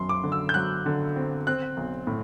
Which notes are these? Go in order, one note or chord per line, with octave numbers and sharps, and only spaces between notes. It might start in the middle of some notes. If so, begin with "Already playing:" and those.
Already playing: F#2 F#3 C6
D6
D3
E6
G6
F#3 F#6
D3
C4
C4 F#6
B1
A2